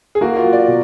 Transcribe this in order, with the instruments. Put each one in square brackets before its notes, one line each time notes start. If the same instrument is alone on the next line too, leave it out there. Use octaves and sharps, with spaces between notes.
[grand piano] G#4
[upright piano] A#3 [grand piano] F#4
[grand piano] F4
[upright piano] F#3
[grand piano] D5
[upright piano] B2